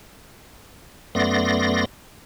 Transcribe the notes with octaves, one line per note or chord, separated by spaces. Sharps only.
F#2 A3 B3 D5 C6 A#6